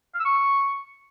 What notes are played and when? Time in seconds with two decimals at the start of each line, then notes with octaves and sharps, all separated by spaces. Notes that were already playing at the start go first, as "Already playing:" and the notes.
0.14 F5
0.20 E6
0.25 C#6